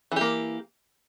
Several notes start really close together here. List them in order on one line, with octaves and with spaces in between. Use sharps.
E3 G4 A#3